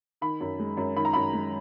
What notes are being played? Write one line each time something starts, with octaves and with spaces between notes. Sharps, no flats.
D#3 B5
F#2
G#3
F#2
D#3 B5
A#5
F#2 B5
G#3